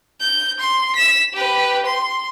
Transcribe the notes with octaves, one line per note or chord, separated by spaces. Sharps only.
G6
C6
B6 E7
G4 B4
C6